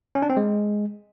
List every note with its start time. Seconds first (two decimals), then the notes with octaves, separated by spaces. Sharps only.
0.15 C#4
0.22 D4
0.30 C4
0.37 G#3